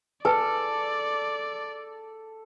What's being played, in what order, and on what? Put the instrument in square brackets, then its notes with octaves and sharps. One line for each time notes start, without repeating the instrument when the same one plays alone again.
[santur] A4 [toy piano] B4 G#5 A5 [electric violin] D5